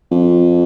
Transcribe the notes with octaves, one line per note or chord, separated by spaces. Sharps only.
F2